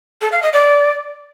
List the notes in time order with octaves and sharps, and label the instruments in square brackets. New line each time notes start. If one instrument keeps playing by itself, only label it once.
[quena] A4
F5
D#5
D5